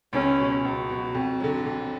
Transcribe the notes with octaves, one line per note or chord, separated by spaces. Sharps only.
C#2 C#4
B2 F#3
C#2 F#4
B2 F#3
F2
D3 F#3
F2